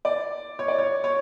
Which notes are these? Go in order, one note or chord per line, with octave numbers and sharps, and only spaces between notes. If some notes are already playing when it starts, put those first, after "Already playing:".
D5
C#5
D5
C#5
C#5